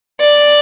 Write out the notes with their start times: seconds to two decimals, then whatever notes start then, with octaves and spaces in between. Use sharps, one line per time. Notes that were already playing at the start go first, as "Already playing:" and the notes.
0.20 D5